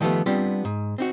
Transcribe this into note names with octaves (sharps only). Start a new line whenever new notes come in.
D#3 F3 A3 B3 G4
G3 B3 C4 D4 F4 G4
G#2
C4 D#4 F#4